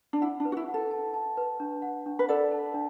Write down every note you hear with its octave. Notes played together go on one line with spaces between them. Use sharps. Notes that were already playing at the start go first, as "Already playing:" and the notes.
D4
E4 F#5
D4
B4
F#4
E4
F#5
A4
A5
A5
B4
D4
F#5
D4
B4
A4 D5 F#5
A5
D4